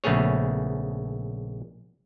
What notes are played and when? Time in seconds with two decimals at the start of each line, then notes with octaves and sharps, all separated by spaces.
0.04 A#1 C#3 A3 B3 G#4 C#5